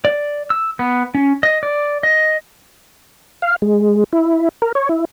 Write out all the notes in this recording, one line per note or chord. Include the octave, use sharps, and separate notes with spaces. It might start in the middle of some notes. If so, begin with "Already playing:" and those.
D5
E6
B3
C#4
D#5
D5
D#5
F5
G#3
E4
A#4
C#5
E4